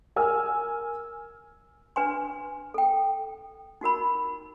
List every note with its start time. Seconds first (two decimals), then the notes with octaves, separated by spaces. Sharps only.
0.16 A#4 G#5 E6 F6
1.96 D4 B4 G#5 C6
2.74 A4 G5
3.81 D#4 F#4 A#4 B5